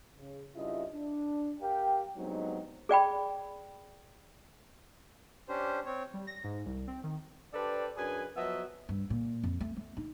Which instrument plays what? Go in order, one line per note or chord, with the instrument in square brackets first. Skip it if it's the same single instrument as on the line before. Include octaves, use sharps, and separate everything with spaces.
[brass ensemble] C#3
G2 C#3 E4 F4 D#5 E5
D4
G4 A#4 F5 G5
G2 F#3 G#3 B3 C4 D#4
[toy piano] G#4 D5 G5 B5
[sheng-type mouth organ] C#4 D4 G4 C5
C4 C#5
[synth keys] G3
A#6
G#2
C2
C4
D#3
[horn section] D4 G4 A4 B4 C5 D5
F#2 D4 G#4 B4 G#5
F3 F#3 B3 F#4 D#5 E5
[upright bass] G2
A#2
F2
A3
A3
D#4